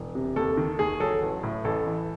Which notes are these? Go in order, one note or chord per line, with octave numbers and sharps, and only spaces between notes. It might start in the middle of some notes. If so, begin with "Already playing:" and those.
Already playing: E1
C3
D#2 A4
D#3
D#2 G#4
F#3 A4
A1
A2
A1 A4
E3